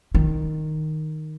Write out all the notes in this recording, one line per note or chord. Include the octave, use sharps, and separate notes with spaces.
D#3